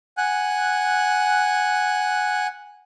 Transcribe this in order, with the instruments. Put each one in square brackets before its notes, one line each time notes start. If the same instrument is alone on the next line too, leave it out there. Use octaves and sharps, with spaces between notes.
[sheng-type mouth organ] F#5 G#5 F#6